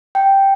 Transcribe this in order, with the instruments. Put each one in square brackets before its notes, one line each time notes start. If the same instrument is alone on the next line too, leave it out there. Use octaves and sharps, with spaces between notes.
[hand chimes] G5